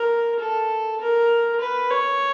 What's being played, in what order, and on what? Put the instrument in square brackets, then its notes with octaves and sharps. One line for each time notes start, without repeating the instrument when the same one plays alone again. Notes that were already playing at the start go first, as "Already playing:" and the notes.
Already playing: [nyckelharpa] A#4
A4
A#4
B4
C#5